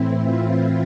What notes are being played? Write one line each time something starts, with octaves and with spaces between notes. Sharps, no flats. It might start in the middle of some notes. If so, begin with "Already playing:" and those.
Already playing: A2 E3 C4 E4
F4